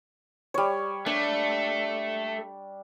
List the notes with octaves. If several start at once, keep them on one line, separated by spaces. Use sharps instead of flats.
G3 C#5
A3 D4